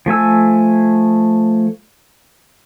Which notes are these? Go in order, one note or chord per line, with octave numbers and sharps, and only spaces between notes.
F3 A3 G#5 E6